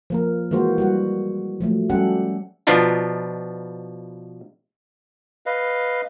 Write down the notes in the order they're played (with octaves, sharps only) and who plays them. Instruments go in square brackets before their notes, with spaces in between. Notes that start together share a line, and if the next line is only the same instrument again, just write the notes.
[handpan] F3 A#3 A#4
E3 G#3 A#3 F#4 C5
G3 F#4 F#5
F3 F#3 A3
F#3 G3 C#4 G4 A4 F#5
[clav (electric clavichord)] B2 F3 B3 D4 D#4 F4
[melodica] B4 D#5 F5